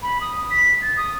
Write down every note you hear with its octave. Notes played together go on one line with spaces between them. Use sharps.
B5
D#6
B6
A6
D#6